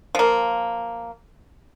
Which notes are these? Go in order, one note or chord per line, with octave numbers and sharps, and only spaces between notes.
F3 A#3